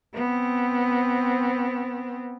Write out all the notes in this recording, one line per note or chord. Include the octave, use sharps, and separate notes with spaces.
B3 C4